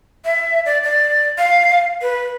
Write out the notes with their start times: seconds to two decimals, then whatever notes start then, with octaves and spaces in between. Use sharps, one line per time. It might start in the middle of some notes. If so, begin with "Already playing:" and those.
0.25 E5
0.66 D5
0.84 D5
1.38 F5
2.02 B4